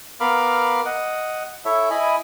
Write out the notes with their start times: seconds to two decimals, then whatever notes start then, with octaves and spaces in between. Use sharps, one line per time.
0.20 B3 A#4 F5 B5 D6 F6
0.86 D#5 F#5
1.65 E4 A4 C#5 E5
1.90 E4 D#5 G#5 B5